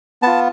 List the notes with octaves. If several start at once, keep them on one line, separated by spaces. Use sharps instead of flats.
B3 F4 A5